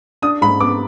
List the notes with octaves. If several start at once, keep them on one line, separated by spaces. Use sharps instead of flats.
D4 D#6
G#2 B5
B3 D6